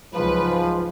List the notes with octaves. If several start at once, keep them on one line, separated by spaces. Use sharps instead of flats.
C#2 G#2 F3 F#3 B4